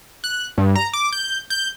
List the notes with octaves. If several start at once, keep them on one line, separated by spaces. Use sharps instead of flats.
F#6
G2
A#5
D6
G6
G6